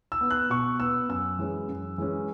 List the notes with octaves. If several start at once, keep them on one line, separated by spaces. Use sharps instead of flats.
E6
B3
F#6
B2 C#6
B3 E6
F#2 E6
E3 G#3 C#4
F#2
E3 G#3 C#4